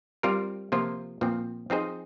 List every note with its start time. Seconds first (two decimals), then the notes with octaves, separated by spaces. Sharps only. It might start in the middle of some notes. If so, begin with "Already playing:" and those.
0.23 G3 C4 F4 A#4
0.72 C3 F3 A#3 F4 C5
1.21 A#2 F3 C4
1.70 F3 C4 D#4 G#4 C5